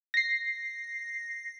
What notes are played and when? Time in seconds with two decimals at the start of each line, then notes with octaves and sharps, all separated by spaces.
0.14 A#6 C7